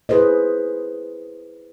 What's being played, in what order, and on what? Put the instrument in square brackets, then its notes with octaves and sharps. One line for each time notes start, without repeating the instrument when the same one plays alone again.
[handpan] E4 G#4 B4 C5 D#5